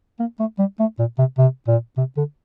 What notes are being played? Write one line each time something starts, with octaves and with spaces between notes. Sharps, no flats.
A#3
A3
G3
A3
A#2
C3
C3
A#2
C3
D3